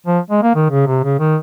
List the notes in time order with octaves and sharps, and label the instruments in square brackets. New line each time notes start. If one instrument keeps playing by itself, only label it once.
[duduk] F3
G#3
A#3
D#3
C#3
C3
C#3
D#3